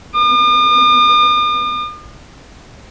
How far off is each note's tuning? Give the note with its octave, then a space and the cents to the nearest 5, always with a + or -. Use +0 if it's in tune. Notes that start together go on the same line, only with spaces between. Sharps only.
D#6 -45